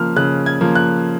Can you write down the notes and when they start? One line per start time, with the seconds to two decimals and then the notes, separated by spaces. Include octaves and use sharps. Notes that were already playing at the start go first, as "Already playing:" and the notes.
Already playing: C#3 F3 A#3 F6
0.16 C#3 F#6
0.46 G#6
0.61 F3 A#3
0.75 F#6